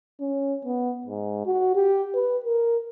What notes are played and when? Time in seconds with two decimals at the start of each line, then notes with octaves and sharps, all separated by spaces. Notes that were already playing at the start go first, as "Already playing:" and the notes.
0.20 C#4
0.65 B3
1.06 G#2
1.46 F#4
1.75 G4
2.15 B4
2.44 A#4